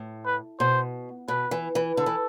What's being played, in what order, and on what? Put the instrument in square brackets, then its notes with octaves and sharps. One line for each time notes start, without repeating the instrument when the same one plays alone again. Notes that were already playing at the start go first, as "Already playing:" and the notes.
Already playing: [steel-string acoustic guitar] A2
[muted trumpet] B4
[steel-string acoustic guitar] B2 [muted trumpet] C5
[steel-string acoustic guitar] B2 [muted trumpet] B4
[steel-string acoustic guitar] E3
E3
[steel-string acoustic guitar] D3 [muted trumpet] A4
[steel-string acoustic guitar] E3